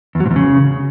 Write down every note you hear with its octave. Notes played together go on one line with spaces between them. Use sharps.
E2
F#3
G#2
E2
C#3